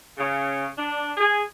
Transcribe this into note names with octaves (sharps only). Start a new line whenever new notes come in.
C#3
D4
G#4